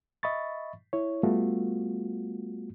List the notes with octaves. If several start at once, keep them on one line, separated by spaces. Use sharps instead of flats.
D#5 E5 B5 C#6 A6
E4 C#5
G3 A3 B3 F4 F#4